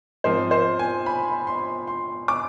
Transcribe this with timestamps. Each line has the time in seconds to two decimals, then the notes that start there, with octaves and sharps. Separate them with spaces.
0.24 G#2 F3 C4 C5
0.51 C5
0.79 G#5
1.06 B5
1.47 C6
1.87 C6
2.28 D6